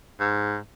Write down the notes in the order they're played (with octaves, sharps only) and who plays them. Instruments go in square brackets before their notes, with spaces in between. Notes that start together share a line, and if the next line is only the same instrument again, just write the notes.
[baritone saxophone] G#2